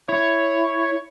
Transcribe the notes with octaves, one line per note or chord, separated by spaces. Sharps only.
E4 C#5